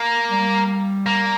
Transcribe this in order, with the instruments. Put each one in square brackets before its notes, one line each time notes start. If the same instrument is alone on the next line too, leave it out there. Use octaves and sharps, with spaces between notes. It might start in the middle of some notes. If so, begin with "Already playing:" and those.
Already playing: [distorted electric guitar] A#3
[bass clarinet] G3
[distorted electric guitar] A#3